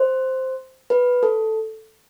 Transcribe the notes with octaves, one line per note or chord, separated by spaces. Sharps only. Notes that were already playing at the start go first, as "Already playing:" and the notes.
Already playing: C5
B4
A4